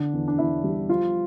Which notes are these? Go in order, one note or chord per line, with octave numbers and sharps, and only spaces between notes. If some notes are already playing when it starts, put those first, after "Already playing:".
Already playing: D3 D4
E2
D4
E2 E4
G3
F3 F4